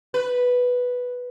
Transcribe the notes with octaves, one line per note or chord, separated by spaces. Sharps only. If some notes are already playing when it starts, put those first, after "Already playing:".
B4